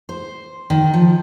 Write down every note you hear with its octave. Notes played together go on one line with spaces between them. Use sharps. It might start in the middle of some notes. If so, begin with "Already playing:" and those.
C5
D#3
F3